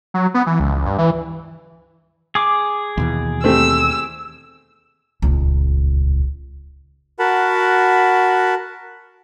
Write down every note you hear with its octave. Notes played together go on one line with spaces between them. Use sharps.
F#3
B3
E3
C#2
G2
E3
G#4 D6
D#2 B2 E3
G3 A3 C4 E6
D#1 C#2
F#4 A#4 F#5 A5 B5